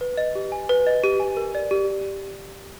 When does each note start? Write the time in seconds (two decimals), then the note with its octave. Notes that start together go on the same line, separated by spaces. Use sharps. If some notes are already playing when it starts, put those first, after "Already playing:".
0.01 B4
0.17 D#5
0.35 G4
0.52 G#5
0.69 B4
0.87 D#5
1.04 G4
1.20 G#5
1.37 A#4
1.55 D5
1.71 G4